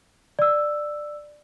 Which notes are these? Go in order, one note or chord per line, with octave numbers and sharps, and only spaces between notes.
D5 E6